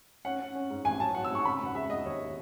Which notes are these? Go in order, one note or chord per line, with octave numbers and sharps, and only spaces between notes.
C#4 F#5
C#4
C#4
G#2
A1 G#5
F#3 A5
F#3 F#5
E6
G#2 C#6
C#3 B5
E1 F#5
G#3 E5
E1 D#5
D#2 C#5